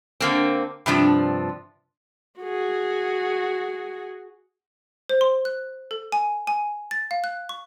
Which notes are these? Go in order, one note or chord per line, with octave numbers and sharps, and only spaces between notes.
D3 A#3 C4
G2 C3 F3 D4
F#4 G#4
C5
C6
F#6
A4
G#5
G#5
A6
F5
F#6
C#6